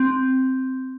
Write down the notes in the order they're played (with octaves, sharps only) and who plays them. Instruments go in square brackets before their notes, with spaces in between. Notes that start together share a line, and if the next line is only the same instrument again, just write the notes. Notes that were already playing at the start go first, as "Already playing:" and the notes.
Already playing: [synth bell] C4